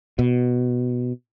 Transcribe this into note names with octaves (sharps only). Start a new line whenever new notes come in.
B2